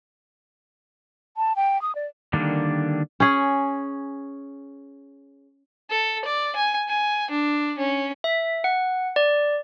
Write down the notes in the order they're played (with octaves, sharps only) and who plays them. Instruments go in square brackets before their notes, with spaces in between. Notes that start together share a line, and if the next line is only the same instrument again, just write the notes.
[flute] A5
G5
D#6
D5
[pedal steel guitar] D3 D#3 G3 A#3 D4
[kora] C#4 G#4
[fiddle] A4
D5
G#5
G#5
D4
C#4
[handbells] E5
F#5
D5